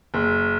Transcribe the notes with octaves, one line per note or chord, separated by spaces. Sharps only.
F#1